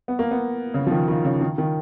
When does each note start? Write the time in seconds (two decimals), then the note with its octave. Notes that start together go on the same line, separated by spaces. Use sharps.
0.08 B3
0.19 A#3
0.31 B3
0.74 C#3
0.87 F3
0.91 D#3
1.08 D#3
1.25 C#3
1.41 D#3
1.58 D#3